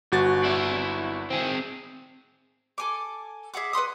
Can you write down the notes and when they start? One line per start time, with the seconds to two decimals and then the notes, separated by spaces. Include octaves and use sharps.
0.12 G1 F#4 A6
0.44 E4 D5
1.30 C4 G#4
2.78 A4 G#5 D6
3.54 G#4 E5 F#5 D6
3.73 B4 F#5 C6 D#6